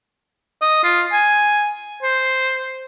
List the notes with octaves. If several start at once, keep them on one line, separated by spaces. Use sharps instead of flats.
D#5
F4
G#5
C5